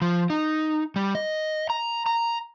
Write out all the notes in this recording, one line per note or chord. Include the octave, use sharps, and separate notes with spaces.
F3
D#4
G3
D#5
A#5
A#5